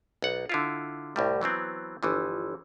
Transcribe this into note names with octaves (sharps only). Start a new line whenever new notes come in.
B1 F#5
D3 E4 F4
C2 A2 G3
E3 F#3 B3 C4
G1 E3 F3